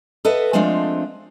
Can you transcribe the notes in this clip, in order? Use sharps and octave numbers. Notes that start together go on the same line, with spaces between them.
A4 B4 D#5 E5 F#5
F3 G#3 A3 C4 D4 F4